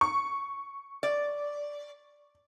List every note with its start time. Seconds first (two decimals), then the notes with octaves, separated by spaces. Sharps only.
0.01 C#6
1.03 D5